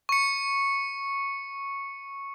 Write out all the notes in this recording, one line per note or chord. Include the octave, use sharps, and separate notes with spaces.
C#6 C#7